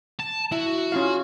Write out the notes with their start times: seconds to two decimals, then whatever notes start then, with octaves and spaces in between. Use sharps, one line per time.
0.19 A5
0.52 E4 F#4
0.92 C#4 F4 F5